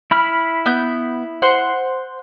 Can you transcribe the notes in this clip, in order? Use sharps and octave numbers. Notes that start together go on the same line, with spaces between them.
E4 B5 F6
B3 G6
C5 F#5 C6